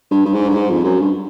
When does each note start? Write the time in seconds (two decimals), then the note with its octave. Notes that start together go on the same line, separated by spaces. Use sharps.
0.11 G2
0.25 G2
0.33 G#2
0.49 G2
0.55 G#2
0.70 F2
0.84 F#2
1.00 G2